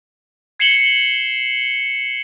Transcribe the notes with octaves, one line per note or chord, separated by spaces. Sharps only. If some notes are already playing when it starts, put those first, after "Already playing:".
G#6 C7 C#7 E7 F#7 G7